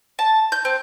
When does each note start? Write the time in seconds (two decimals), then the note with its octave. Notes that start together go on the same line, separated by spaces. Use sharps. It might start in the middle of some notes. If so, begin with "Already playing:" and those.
0.19 A5
0.52 G6
0.65 C4